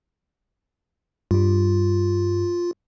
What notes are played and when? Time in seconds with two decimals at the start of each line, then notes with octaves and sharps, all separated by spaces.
1.31 G2 G3 F4